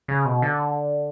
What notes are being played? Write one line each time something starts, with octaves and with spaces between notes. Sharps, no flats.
C#3
B2
D3